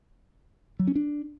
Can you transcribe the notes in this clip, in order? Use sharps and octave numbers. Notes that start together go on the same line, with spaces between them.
F#3
C#4
D4